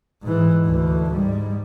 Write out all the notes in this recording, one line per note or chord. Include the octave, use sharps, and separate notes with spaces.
G#2 E3
D2 E3
G#2 G3